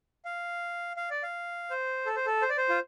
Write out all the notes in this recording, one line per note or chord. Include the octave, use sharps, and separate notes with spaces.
F5
F5
D5
F5
C5
A4
C5
A4
C5
D5
C5
F4